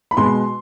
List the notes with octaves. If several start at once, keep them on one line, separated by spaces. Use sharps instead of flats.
B5
B2 G#3 B3 C6